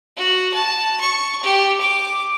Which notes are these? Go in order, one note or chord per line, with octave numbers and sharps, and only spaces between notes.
F#4
A5
C#6
G4
D6